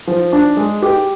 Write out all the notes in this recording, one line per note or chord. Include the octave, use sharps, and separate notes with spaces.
F3
D4
G#3
G4